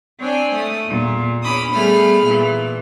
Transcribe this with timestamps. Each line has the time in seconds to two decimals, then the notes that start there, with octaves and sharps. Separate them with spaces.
0.20 C4 D4 C#5 G#5
0.54 A3 D#6
0.85 E2 A#2
1.43 E2 C#4 B5 D6 D#6
1.73 G3 A3 B3 G#4 B5 F6
2.24 A#2 E3